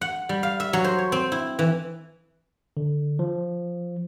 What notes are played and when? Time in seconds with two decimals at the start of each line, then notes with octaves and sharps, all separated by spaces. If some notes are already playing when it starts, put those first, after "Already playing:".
0.01 F#5
0.29 G3
0.43 F5
0.60 E5
0.73 F#3
0.84 C5
0.98 C#5
1.12 C4
1.32 E4
1.59 E3
2.77 D3
3.19 F3